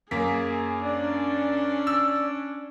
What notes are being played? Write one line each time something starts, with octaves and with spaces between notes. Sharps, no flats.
F#2 A#3 G#4 B6
C#4 D4 D5
E6